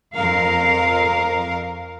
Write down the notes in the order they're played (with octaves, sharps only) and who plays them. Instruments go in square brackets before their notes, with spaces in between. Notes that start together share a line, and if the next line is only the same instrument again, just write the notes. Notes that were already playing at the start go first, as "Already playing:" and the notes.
[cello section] F2 A#4 F5